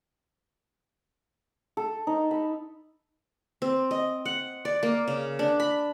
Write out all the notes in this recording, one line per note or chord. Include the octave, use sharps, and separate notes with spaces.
A4
D#4
B5
C4
D#5
F#5
D5
A#3
C#3
D4
B5